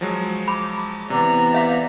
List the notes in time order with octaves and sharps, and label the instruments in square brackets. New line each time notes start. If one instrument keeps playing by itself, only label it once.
[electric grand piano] F3 F#3 G#3
[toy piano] B5 [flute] D6
[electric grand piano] C3 [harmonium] E3 B3 D5 [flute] A#5
[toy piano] E5 F5 D6